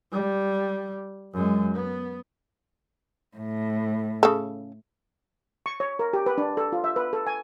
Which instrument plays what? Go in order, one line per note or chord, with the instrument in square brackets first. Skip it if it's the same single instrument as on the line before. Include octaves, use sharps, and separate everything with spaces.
[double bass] G3
F#2 G#3
B3
[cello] A2
[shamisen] C#3 A4
[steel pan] C#6
C#5
A#4
G4
B4
D4
A4
F4
E5
B4
A4
G#5